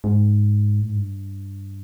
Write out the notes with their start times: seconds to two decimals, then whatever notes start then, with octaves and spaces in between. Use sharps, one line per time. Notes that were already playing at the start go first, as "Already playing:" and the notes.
0.04 G#2
0.80 A2
0.89 G#2
0.97 G2